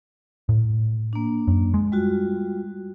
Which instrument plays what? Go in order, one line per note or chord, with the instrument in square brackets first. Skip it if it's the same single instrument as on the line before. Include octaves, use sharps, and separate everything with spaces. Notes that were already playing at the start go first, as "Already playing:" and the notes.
[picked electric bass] A2
[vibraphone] A#3 D4
[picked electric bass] F#2
G#3
[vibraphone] G3 F4 F#4